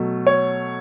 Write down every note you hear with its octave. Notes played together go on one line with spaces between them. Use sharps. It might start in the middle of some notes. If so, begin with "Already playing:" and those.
Already playing: B2 F#3 A3
C#5